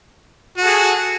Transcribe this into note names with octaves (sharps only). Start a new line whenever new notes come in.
F#4 G#4 A4